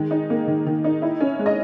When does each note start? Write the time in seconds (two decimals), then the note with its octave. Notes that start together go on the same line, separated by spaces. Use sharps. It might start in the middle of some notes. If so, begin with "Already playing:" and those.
Already playing: D#3 G#3
0.11 D#4
0.30 A#3
0.47 D#3
0.66 D#3
0.84 D#4
1.02 E4
1.20 C#4
1.39 G#3
1.46 D#5